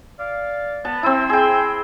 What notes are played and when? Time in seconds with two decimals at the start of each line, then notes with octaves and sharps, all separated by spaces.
0.19 D5 F5
0.85 B3 A5
1.03 C4 E4 E5 C6 E6
1.29 G#4 G5